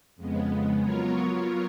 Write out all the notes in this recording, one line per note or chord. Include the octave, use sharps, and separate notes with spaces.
F2 C#3 G#3 B3
F#3 B3 F4 A#4 C#5